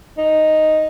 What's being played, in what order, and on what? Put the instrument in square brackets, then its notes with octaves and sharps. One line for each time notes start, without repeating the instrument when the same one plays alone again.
[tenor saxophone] D#4